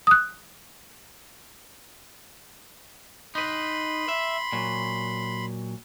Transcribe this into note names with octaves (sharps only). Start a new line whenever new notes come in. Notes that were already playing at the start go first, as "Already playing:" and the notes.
D#6 F#6
D#4 B4 B5 C6
E5
A#2 F#3